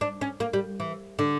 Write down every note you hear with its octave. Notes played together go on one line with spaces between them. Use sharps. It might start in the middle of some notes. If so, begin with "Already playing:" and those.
D4
C#4
A#3
G3
E3
D3